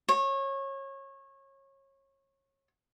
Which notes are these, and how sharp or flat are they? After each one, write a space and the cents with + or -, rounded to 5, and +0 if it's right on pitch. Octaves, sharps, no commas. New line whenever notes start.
C#5 -25